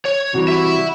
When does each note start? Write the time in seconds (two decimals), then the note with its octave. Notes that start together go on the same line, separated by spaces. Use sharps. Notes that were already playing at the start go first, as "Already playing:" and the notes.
0.06 C#5
0.34 C3 E3 G3 F#4
0.48 E5 B5